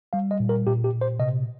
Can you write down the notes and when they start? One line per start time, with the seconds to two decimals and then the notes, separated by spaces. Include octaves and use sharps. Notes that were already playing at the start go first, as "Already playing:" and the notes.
0.13 G3 F5
0.31 D#5
0.40 A#2
0.49 A#4
0.66 A#2 G4
0.84 G4
0.93 A#2
1.01 C5
1.19 C3 D#5